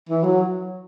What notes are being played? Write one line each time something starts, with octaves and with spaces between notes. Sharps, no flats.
E3
F#3